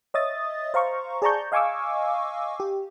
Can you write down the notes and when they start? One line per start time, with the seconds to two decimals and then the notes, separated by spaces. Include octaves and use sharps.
0.14 C#5 D#5 E5 D#6 A6
0.74 C5 F5 A#5 C#6
1.22 G#4 D5 A5 A#5 C#6 G6
1.52 D#5 F5 G#5 C#6 D6 E6
2.60 G4